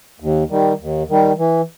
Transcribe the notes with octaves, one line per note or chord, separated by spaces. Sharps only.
D#2
D#3 G3
D#2
D#3 G3
E3